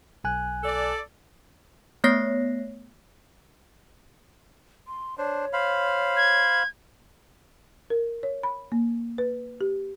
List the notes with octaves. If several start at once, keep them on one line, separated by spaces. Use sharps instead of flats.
B1 G#5 F#6
A4 D5
A3 B3 C#5 A#6 C7
C6
D4 C5 C#5
C5 F5 B5
G#6
A#4
C#5
B5
A#3
B4
G4